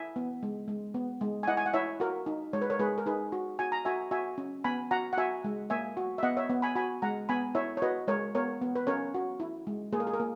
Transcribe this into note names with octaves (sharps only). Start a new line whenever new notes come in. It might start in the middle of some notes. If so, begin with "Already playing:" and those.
Already playing: E4 E5 G#5
B3
G#3
G#3
B3
G#3
G#5
E4 D#5 F#5
G#5
F#5
E4 C#5 E5
F#4 A#4
D#4
G#3 C#5
B4
A#4 C#5
G#3 G#4 B4
A#4
D#4 G#4 B4
F#4
F#4 G#5
A#5
F#4 E5 G#5
F#4 E5 G#5
C#4
B3 G#5 B5
F#4 F#5 A#5
F#5
F#4 E5 G#5
G#3
A#3 E5 G#5
F#4
E5
B3 D#5 F#5
C#5 E5
B3
G#5 B5
F#4 G#5 B5
G#3 F#5 A#5
B3 G#5 B5
E4 C#5 E5
C#5
F#4 B4 D#5
G#3 A#4 C#5
B3 A#4 C#5
B3
B4
C#4 A#4 C#5
F#4
E4
G#3
A#3 G#4
A#4
G#4
A#4
A#3